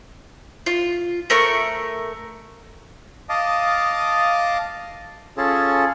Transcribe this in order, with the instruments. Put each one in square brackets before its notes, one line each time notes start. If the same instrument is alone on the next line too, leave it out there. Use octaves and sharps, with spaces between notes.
[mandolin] F4
A3 A#4 C#6
[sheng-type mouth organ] D#5 F5 A5 D6 D#6
C#4 F4 G#4 A4 A5